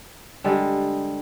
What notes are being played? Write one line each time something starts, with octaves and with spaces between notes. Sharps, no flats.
D3 G3 G#3